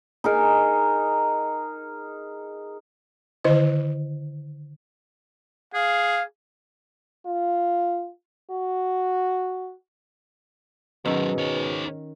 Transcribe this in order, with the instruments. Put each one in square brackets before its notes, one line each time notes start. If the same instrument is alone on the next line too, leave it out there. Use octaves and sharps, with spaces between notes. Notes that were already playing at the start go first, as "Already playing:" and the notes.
[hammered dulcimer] D#4 G#4 A#4
[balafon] D3 D#3 E4 C5 D#5
[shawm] G#4 [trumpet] F5
[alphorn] F4
F#4
[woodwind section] G#2 B2 [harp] D#3 C#4 E6 [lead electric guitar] F#3 C5
[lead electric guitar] D#4 C#5